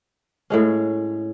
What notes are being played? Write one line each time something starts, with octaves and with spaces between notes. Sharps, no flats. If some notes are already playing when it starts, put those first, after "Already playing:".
A2 G#3 C#4